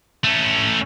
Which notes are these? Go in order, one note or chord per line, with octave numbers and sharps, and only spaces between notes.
A3 C#4